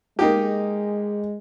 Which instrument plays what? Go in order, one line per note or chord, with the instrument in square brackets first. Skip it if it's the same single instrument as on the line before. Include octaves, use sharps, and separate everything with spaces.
[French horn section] G#3 [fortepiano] A#3 D#4 G4